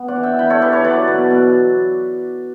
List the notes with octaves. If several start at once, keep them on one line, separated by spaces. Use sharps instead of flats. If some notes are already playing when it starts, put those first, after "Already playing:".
Already playing: B3
D5 F#5
E3
E5 G5
E3 G5 B5
A4 C#5
E3 G4 B4
A4 C#5
F#3 B4 D5
B2
B2